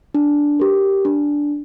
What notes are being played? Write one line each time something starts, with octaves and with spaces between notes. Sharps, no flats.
D4
G4 A#4
D4